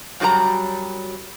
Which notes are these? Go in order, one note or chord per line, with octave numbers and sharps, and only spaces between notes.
F#2 F#3 G3 G4 A#5